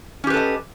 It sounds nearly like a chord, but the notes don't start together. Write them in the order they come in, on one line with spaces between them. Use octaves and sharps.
C#4 G4 B4 A4 D#5